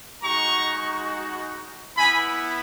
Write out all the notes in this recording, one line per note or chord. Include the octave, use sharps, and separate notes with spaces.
G#3 D#4 F#4 A#5 C#6
B3 E4 G#5 B5